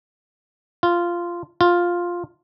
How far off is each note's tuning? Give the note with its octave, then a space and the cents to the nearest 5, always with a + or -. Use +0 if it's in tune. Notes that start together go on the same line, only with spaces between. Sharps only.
F4 -10
F4 +5